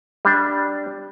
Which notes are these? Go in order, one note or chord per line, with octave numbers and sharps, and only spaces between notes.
G3 D4